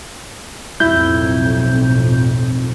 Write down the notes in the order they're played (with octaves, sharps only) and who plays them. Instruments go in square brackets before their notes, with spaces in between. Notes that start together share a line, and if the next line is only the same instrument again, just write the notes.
[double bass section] B1 F2 A2 [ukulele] E4 [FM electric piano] G6